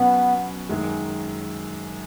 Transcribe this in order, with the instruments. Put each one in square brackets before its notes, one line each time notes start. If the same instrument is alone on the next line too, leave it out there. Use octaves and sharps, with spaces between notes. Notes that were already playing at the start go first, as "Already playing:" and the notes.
Already playing: [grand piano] B2 F#3 C#4 B4 [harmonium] B3
[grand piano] F#2 D#3 G#3